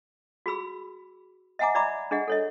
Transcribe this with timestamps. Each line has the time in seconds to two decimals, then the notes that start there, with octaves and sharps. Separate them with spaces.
0.46 F#4 G#4 B5 E6
1.59 D#5 E5 F#5 G#5 A#5 D6
1.75 D5 E5 A#5 B5 D6
2.11 D4 G#4 D#5 F#5
2.28 A4 C#5 D#5